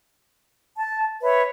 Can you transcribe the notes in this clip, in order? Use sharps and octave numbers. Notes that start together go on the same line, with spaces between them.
A5
B4 C#5 E5